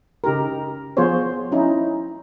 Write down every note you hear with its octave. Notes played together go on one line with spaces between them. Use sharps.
C#3 D#4 G4 A#4
F3 B3 F4 G#4 C5 C#5
C#4 D#4 E4